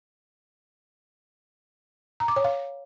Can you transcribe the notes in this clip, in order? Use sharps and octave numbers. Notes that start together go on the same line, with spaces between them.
A#5
D6
C#5
F5